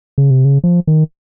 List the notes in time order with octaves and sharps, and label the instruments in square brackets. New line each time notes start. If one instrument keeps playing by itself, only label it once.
[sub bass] C#3
C3
C#3
F3
D#3